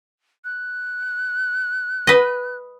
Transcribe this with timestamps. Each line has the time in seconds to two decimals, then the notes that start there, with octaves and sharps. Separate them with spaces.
0.45 F#6
2.07 B4 D#5